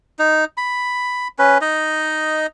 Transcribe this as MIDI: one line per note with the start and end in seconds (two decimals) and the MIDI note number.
0.19 0.45 63
0.57 1.28 83
1.39 1.58 61
1.39 1.58 71
1.61 2.47 63
1.61 2.47 75